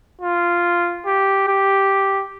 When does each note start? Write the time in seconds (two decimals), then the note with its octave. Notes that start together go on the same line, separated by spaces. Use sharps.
0.21 F4
1.06 G4
1.48 G4